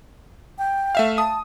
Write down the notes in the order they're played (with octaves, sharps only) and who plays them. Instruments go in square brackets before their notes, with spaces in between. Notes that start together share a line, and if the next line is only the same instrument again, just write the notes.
[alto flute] G5
[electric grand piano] A3 E5 F5
[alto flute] A5 [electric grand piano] D#6